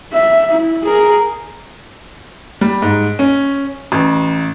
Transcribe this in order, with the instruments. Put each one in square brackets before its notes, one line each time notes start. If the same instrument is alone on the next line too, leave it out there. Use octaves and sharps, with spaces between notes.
[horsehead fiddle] E5
E4
G#4 A#4
[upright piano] G3
G#2
C#4
A1